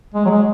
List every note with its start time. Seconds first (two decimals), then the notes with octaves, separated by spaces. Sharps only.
0.14 G#3
0.26 F#3
0.30 G#3